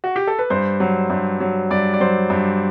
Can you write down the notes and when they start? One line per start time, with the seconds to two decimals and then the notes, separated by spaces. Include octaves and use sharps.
0.04 F#4
0.16 G4
0.27 A4
0.39 B4
0.50 G2 C5
0.80 F#3
1.10 G2
1.40 F#3
1.71 G2 D5
1.94 D5
2.00 F#3 C5
2.30 G2